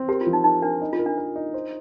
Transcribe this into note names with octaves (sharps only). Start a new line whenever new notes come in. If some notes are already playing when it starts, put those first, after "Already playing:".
Already playing: C4
G4 A#4
F4
F3
D#4
D#4 A#4
D4 A#4
D#4
F4
A#4
D4
A#4
D#4
C5